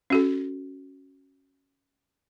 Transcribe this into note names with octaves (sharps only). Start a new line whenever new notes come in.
C#4 F#4 A4